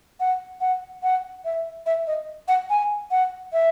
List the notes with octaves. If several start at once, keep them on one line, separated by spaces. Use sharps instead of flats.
F#5
F#5
F#5
E5
E5
D#5
F#5
G#5
F#5
E5